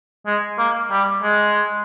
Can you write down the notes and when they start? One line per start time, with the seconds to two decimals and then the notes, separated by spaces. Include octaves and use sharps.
0.26 G#3
0.59 A#3
0.91 G3
1.23 G#3